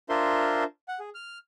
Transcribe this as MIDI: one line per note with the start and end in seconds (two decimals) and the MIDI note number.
0.09 0.64 62
0.09 0.64 65
0.09 0.64 70
0.09 0.64 72
0.09 0.64 76
0.09 0.64 84
0.88 0.99 78
1.00 1.10 68
1.15 1.38 89